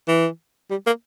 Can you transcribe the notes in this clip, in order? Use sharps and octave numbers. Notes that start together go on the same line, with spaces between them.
E3
G3
A#3